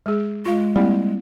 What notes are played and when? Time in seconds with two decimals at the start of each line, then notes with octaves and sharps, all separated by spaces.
0.06 G#3 G#4
0.46 G#3 F4 F5
0.76 G3 A#3 C4 E4